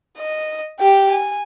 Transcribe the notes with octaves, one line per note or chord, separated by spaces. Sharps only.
D#5
G4 G5
G#5